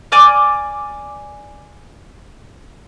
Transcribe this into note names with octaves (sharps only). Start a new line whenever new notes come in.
D5 G#5 D6 F6